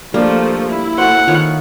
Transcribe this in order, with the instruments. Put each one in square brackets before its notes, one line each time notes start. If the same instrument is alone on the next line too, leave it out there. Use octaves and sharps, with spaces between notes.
[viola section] F3 A3 [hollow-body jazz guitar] G3 D4 [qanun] A#3
[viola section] E4
[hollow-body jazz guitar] A3 F#4 C5 [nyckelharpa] F#5
[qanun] D#3 F4 C#5